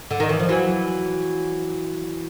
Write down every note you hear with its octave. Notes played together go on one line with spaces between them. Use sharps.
D3
D#3
E3
F3
E3 F#3